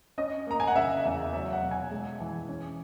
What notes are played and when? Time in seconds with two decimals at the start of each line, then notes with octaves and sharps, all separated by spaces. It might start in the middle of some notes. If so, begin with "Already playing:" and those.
0.18 C#4 D#5
0.47 A#3 A#5
0.60 G#5
0.68 F#5
0.76 C#3 E5
1.04 E2 E5
1.33 F#3 E5
1.53 F#5
1.62 B2
1.71 G#5
1.91 G#3
2.20 E3
2.49 C#4